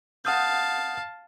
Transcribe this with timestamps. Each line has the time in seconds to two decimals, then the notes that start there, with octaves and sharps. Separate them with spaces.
0.25 F5 F#5 A5 D#6 G6